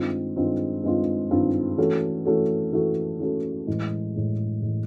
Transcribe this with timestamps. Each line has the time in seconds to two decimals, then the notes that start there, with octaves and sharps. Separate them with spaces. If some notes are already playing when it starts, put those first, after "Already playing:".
Already playing: G2 D#3 G#3 C4 F4
0.36 G2 D#3 G#3 C4 F4
0.84 G2 D#3 G#3 C4 F4
1.30 G2 D#3 G#3 C4 F4
1.78 E3 A3 C#4 F#4 A4
2.25 E3 A3 C#4 F#4 A4
2.73 E3 A3 C#4 F#4 A4
3.20 E3 A3 C#4 F#4 A4
3.67 A2 E3 G#3
4.15 A2 E3 G#3
4.62 A2 E3 G#3